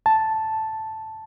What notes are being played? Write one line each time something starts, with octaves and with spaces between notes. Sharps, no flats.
A5